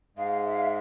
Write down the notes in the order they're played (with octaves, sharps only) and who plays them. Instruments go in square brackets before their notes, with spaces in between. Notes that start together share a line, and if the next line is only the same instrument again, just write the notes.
[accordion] G#2 G#3 [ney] F5
[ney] E5
F5
E5